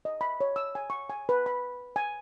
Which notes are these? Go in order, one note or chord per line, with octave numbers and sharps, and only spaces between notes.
D#5
B5
C#5
E6
G#5
C#6
G#5
B4
B5
G#5